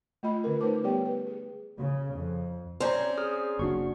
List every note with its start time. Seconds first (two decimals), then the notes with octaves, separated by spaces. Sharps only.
0.23 A3 F4 D#5 B5
0.44 D3 C#4 F4 A#4
0.61 A3 D#4 B4 C5 A5 D6
0.83 G3 B3 G4 C#5 D5 G5
1.06 B4
1.27 G#4
1.79 C#3
2.16 F2
2.80 C4 C#4 C5 D5 A#5
3.18 G#4 D#6 F6
3.59 F#1 D4 F#4 C#6